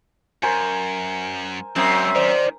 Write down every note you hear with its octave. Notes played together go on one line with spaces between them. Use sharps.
F#2 A#4 C5 G#5
F#2 F#3 G#3 C4
D#3 C5 D5